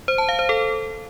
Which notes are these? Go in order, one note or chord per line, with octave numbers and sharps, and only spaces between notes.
C5
A5
F5
C5
A4